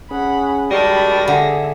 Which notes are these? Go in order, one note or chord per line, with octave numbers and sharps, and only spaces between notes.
C#4 G#4 F#5 B5
F#2 D#3 G3 G#3 G4 A5 B5 A#6
D3 G#4 E5